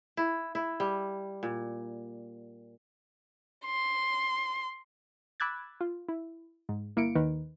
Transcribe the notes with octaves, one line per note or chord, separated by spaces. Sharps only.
E4
E4
G3
A#2
C6
B5 D6 E6 F#6 G#6 A6
F4
E4
G#2
G1 A#3 E4 C#7 D7
D#2 D#3 B4